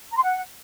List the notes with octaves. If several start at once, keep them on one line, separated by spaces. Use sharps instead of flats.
A#5
C6
F#5